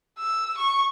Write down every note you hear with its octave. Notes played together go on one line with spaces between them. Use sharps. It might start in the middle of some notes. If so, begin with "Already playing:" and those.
E6
C#6